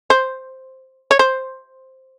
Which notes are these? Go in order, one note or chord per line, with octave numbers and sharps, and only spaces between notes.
C5
C#5
C5